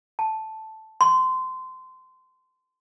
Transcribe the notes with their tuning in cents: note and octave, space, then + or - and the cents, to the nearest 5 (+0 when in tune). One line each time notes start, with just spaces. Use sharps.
A5 -5
C6 -20